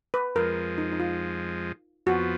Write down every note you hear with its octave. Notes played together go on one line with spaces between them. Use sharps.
B4
F2 F3 G#3 A#4
D#4
D#4
F4
F2 F3 B3 F#4